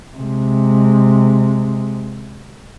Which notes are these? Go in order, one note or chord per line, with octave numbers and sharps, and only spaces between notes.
C3 G#3